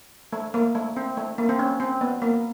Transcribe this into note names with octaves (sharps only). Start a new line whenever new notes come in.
A3
A#3
A3
C4
A3
A#3
C4
C#4
C4
B3
A#3